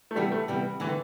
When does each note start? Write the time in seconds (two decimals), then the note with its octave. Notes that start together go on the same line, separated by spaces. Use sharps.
0.11 A3
0.16 C3 E3 G3 B3
0.32 A3
0.48 C3 E3 G3 B3
0.80 D3 E3 A3 C4